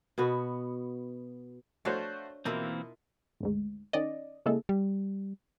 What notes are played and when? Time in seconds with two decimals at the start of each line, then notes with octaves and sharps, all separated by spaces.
0.18 B2 B3 F#4
1.85 A3 D4 F#4 C5 C#5 F5
2.45 B2 E3 A#3 C4 E4 F4 A#4
3.40 G#1 D2 G#2
3.93 D#3 C#4 D5 D#5
4.46 C#3 G#3 A#3 E4 G#4 A4
4.69 G3